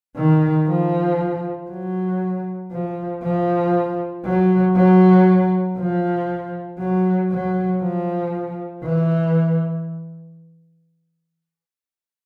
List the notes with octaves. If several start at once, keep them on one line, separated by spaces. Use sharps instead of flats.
D#3
F3
F#3
F3
F3
F#3
F#3
F3
F#3
F#3
F3
E3